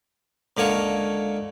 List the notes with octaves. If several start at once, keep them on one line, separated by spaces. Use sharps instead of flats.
C#2 D3 A#3 C#5 C#6